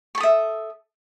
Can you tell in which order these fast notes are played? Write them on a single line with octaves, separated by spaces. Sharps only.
C#6 A4 D#6 E5